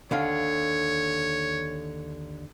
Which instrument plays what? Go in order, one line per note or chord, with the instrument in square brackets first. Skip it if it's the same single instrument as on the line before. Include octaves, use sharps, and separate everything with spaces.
[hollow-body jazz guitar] D#2 D3 F5 [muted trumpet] C#5